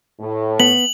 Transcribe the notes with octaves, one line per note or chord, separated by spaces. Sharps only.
A2
B3 F#7